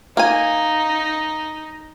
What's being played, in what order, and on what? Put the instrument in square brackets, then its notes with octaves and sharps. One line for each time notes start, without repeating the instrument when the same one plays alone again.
[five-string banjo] A#3 G#5 [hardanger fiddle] D#4